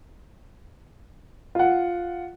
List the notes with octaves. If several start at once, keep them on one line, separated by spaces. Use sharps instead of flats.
F4 F#5